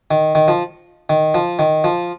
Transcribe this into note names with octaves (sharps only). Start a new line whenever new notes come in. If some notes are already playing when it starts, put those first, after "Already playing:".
D#3
D#3
F3
D#3
F3
D#3
F3